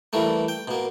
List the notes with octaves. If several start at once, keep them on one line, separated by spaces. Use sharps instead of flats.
E3 G3 A3 A#3
G5
B2 A#3